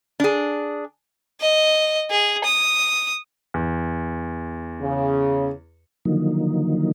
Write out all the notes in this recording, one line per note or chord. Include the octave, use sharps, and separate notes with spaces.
D4 G#4
D#5
G#4
D#6
E2
C#3
D3 D#3 F3 F#3 A#3 D#4